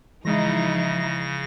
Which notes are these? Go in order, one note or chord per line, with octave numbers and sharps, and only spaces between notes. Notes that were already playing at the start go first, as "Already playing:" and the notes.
C#3 E3 F3 G#3 D#4 E4 D#5 A#6